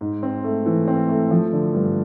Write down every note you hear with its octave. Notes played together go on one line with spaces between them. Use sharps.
G#2
C4
A3
E3
C4
A3
F3
D3
G2